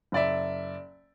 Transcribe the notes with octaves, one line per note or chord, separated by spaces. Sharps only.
F#1 D5 E5